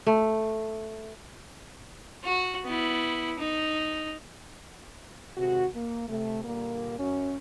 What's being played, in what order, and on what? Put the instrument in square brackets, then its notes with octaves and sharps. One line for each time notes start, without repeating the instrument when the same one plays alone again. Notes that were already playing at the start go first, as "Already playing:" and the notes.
[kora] A3
[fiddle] F#4
B3 E4
D#4
[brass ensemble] C3 D#3 G#3 F#4
A#3
C3 A3
A#2 D3 G3 A#3
F#2 F#3 C#4